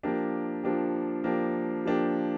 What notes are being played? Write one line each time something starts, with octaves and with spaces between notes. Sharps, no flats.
F3 A#3 D4 G4
F3 A#3 D4 G4
F3 A#3 D4 G4
F3 A#3 D4 G4